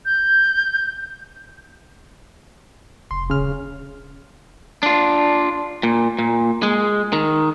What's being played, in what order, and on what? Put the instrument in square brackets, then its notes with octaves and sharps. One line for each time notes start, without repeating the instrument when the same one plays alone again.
[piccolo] G6
[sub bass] F1 [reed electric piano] C6
[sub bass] D#1 [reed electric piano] C#3 F6
[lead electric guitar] D4 F4
A#2
A#2
G#3
D#3